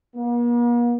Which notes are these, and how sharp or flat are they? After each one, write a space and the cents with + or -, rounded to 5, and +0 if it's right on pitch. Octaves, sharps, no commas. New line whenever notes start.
A#3 +45